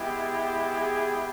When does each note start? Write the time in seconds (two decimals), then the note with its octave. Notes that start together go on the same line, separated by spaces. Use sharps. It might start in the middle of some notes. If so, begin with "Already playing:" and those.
Already playing: G#3 B3 E4 G4
0.79 G#4